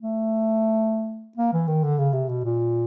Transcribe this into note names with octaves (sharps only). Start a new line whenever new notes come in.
A3
A#3
E3
D#3
D3
C#3
C3
B2
A#2